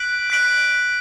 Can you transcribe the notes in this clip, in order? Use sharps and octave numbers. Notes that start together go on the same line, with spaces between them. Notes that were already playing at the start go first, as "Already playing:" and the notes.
Already playing: F#6 B6 D7 F#7
F#6 B6 D7 F#7